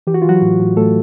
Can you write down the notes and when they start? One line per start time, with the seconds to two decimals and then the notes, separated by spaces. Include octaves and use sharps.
0.07 E3 G4
0.14 F#4
0.22 F4
0.24 E3 F#3 F#4
0.42 A2
0.60 A2
0.77 A2 A3 A4